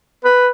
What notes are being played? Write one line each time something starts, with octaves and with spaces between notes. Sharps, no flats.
B4